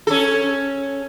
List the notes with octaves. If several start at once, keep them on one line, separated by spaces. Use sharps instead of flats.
C#4 A4